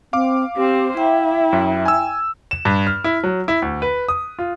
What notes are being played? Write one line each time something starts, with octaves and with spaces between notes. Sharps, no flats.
C4 F5 D6
C4 G4 C5
E4 E5 G5
F#2
G#5 E6
E7
G2
F6
E4
F#3
E4
D2
B4
D#6
F4